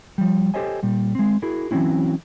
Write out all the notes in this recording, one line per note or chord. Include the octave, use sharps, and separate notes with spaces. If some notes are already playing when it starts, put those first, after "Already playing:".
F3 G3
G4 A4 C5 C#5 D#5 G#5
A#2 G3
G#3 C4
E4 F#4 G#4 A#4
E3 F#3 C4 C#4 E4